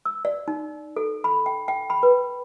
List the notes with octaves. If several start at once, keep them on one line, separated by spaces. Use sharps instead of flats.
E6
D5
D#4
A4
B5
G5
G5
B5
B4